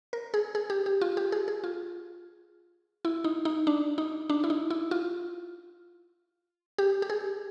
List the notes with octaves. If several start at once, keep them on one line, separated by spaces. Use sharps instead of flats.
A#4
G#4
G#4
G4
G4
F4
G4
G#4
G#4
F4
E4
D#4
D#4
D4
D#4
D4
E4
D#4
E4
F4
G4
G4
G#4